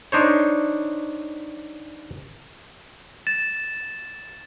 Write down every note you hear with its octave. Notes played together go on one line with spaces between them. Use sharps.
D4 D#4 C5 C#5
A6 E7